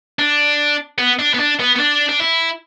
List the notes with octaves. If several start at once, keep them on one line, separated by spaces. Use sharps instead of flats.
D4
B3
D4
B3
D4
B3
B3
D4
D4
E4